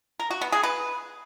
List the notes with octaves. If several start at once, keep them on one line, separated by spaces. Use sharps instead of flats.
A#4
F#4
B3
G#4
B4